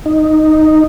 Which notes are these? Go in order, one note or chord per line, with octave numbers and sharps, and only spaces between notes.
D#4